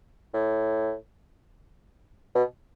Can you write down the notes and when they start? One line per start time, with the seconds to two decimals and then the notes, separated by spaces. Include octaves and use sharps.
0.34 A2
2.35 B2